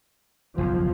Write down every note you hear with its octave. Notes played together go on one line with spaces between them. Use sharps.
F#1 B1 E2 F3